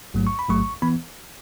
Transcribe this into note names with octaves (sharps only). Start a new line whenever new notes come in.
A1 G#2 F#3 A3
C#6
B5
A1 G#2 F#3 A3 C#6
E3 B3 B5